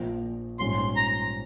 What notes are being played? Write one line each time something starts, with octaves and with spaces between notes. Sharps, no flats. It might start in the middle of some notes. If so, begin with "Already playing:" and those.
Already playing: A#1 A#2 F3
A#1 G#2 G3 C#4 C6
A#5